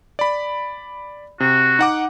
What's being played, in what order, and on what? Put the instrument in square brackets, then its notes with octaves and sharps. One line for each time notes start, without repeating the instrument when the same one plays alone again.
[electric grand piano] D5 B5
[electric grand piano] C3 [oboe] F#4
[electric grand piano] D#4 F#5 D6